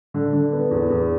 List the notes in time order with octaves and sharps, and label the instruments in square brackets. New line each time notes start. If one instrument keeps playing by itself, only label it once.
[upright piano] D3
D3
B3
E2
E2